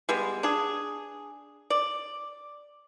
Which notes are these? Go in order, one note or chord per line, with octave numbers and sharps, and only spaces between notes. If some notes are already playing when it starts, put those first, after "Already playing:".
G3 G#3 B3
D4 G#4
D5